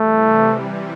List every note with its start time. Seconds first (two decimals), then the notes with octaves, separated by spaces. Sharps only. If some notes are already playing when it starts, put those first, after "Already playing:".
Already playing: C3 E3 G3 A3